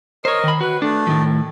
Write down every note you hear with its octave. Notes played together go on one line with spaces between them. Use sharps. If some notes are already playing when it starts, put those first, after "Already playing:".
A#4 C5 C#5 D#5
D#3 B5
F#4 B4
A3 D4
A2 D#3 F3